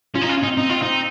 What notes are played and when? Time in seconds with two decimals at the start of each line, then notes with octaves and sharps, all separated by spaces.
0.15 C#4 F4
0.22 D#4
0.26 C#4
0.30 F4
0.37 C#4
0.44 D#4
0.47 C4
0.58 D#4
0.70 F4
0.83 D#4